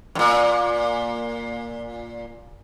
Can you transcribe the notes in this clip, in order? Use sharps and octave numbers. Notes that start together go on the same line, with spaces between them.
F#2 A#2